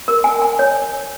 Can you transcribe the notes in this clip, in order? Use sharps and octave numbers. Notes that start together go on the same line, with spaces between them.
A#4
G#5
G#5
C#5